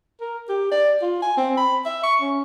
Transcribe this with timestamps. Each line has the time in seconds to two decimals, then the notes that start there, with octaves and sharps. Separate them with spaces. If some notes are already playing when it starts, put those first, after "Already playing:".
0.21 A#4
0.49 G4
0.72 D5
1.02 F4
1.22 G#5
1.37 C4
1.57 B5
1.86 E5
2.03 C#6
2.21 C#4